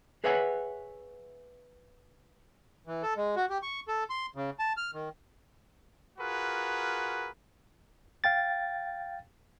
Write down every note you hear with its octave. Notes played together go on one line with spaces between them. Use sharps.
G#4 B4 C#5 E5 F#5 G#5
E3
A4
G#3
F#4
G4
C#6
A4
C6
C#3
A5
F6
D#3
F4 F#4 G#4 A#4 B4
F5 G5 A6